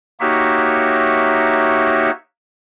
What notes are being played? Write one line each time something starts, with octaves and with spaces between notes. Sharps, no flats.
A#3 D#4 F#4 G4 C#5 E5